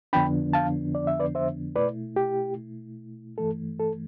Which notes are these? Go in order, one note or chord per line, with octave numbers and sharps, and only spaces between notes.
F2 D3 F3 B3 D4 G5 B5
F5 A5
D5
E5
B4 D5
C5 E5
B2 A3 E4 B4 D5
G4
G2 E3 A3 A4
A4